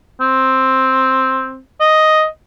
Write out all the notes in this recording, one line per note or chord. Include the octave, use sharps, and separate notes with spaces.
C4
D#5